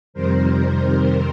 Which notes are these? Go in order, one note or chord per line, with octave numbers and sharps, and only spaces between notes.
F2 C3 D#3 G3 A#4 C5